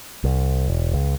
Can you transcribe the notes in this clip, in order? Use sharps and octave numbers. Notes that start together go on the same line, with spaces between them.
C2
E1
C#2